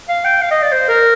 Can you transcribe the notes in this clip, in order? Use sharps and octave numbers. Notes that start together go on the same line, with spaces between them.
F5
G5
F5
D#5
D5
C5
A#4